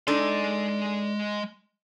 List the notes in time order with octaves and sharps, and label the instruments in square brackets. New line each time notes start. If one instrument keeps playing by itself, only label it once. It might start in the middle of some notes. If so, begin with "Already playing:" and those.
[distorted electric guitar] G#3 C6 [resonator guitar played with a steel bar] D4 D#4 A4